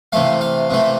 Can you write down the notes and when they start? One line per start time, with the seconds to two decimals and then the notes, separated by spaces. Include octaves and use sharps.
0.12 C3 E3 A3 F5
0.41 F5
0.70 C3 E3 A3